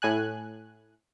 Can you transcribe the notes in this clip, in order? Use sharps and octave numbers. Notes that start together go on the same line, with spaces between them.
A2 G#5 F#6